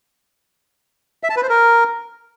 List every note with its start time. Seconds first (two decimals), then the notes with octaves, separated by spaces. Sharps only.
1.23 E5
1.30 A5
1.36 B4
1.43 C5
1.49 A#4